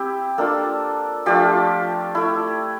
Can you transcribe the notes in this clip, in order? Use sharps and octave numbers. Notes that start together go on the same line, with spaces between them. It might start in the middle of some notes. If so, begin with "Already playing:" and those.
Already playing: C4 E4 G4
A#3 D4 F4 A4
F3 A3 D4 F4 G4
A3 E4